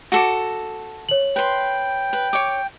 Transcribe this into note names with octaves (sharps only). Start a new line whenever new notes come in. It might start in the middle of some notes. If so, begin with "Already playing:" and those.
F#4 A4 D6
C#5 F#7
B4 G5 C6
B4
C#5 D6